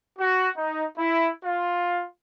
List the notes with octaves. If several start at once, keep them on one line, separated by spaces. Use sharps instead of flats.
F#4
D#4
E4
F4